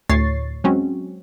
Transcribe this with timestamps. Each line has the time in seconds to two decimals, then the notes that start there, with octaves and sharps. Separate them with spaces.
0.09 D2 A2 C#5 C#6 A6 C7
0.64 F#3 G#3 C4 C#4 F#4